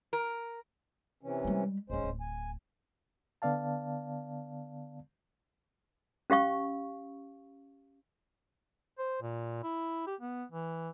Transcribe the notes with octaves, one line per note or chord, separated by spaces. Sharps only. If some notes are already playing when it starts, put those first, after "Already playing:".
A#4
C3 E3 C#4
G3 G#3
D1 G#3 C#4 D#4 C5
D1
G#5
D3 B3 D5 F5 A5
C#4 G4 F5 C#6
C5
A#2
E4
G4
B3
E3